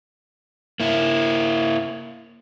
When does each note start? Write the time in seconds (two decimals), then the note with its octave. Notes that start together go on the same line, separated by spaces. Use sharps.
0.80 A#3 E4